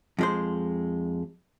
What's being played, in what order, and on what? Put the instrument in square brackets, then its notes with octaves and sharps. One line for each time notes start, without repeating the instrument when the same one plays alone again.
[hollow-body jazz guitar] F2 G#3 C5